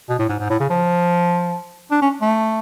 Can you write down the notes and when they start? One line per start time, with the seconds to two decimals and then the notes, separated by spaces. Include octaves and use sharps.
0.09 B2
0.19 A2
0.29 G#2
0.40 G#2
0.50 A2
0.60 C#3
0.70 F3
1.91 D4
2.02 C#4
2.22 A3